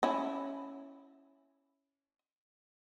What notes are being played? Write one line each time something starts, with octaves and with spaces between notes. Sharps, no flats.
C#4 E4